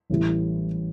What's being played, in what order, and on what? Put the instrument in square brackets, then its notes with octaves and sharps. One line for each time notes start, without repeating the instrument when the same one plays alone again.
[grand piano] A1 A2 E3 G3